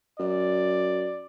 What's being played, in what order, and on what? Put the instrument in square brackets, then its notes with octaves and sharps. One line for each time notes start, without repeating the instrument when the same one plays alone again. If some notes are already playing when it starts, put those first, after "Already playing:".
[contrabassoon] F#2 [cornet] D5